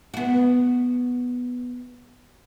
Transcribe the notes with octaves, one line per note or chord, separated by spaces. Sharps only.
B3 F#4